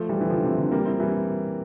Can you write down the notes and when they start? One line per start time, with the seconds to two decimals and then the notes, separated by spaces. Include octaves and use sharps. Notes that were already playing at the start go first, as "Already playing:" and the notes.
Already playing: F3 A3
0.09 E3 G3
0.21 E3
0.30 D3 F3
0.44 C3
0.58 D3
0.72 G3 A#3
0.85 C4 E4
1.00 E3 G3